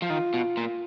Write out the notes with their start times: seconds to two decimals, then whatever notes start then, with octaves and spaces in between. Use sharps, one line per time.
0.02 F3
0.09 D#3 F4
0.34 B2
0.57 A#2